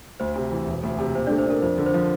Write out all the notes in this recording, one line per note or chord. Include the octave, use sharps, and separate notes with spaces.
D2 C5
C3
E3
E1
D2
C3
A#2 C5
A3 D4 D5
C5
D4 A#4
F2 C5
D3
C5
F3